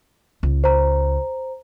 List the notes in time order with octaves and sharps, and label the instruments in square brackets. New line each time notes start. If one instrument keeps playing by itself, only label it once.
[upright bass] C#2
[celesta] C5 A#5